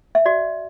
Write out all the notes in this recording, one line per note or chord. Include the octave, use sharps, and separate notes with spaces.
E5
F#4 D5